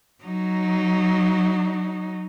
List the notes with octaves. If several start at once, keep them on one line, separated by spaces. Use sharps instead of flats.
F#3 D#4